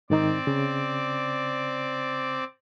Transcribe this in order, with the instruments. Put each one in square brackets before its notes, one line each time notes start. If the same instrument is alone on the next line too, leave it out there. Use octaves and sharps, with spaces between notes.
[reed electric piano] G#2 D#3 D#4 [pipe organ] C4 D5
[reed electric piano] C#3